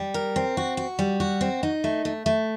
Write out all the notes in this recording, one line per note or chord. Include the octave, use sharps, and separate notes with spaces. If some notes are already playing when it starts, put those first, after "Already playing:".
Already playing: G3
A#4
C4
F#4
F#4
G3
F#4
C4
D#4
A3
A3
A3